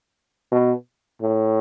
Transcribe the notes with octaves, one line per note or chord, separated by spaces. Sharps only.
B2
A2